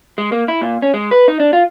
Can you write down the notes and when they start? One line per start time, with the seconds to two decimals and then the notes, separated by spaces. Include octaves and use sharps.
0.18 G#3
0.32 A#3
0.48 E4
0.62 A#2
0.82 C#4
0.94 G#3
1.11 B4
1.28 D#4
1.40 D4
1.53 F4